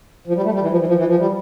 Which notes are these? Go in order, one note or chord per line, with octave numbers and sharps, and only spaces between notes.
F3
G3
A3
G3
E3
F3
E3
F3
E3
F3
G3